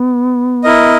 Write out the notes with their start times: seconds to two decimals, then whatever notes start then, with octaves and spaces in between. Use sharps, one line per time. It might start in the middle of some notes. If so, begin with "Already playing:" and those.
Already playing: B3
0.64 E4 A#4 D#5